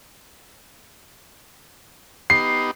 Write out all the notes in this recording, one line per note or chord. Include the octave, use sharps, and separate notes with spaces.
B3 D#4 G4 C7